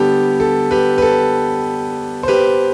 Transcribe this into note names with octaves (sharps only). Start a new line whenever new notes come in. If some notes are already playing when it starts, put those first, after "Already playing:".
Already playing: D3 G3 B3 G4 A4
A4
G4 B4
B4
A4
C5
G4 B4